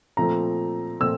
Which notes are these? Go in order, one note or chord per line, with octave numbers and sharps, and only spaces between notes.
A#2 F3 A3 C4 A#5
A#2 F3 A3 C4 E6